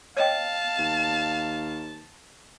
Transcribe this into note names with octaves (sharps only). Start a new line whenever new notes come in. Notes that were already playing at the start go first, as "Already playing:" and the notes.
C#5 D#5 F5 G5 A5
D#2